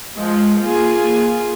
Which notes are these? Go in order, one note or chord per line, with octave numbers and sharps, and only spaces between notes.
F3 G#3
A#3 F4 G#4